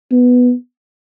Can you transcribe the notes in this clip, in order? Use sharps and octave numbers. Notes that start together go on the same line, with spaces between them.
B3